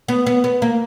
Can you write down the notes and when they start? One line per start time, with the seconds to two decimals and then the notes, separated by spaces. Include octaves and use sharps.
0.08 B3
0.26 B3
0.44 B3
0.62 A#3